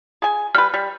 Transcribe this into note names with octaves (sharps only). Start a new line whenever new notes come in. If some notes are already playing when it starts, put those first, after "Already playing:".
G#4 G#5
G3 B4 F6
G3